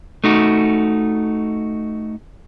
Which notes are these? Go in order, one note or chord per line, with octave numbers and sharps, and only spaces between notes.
A3 D#4 F#4